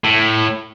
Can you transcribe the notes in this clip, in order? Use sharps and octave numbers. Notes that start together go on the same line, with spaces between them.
A2